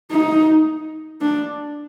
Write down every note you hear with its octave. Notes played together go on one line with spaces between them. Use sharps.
D#4
D4